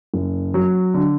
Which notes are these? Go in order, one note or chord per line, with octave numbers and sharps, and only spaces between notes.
F#1
F#3
D3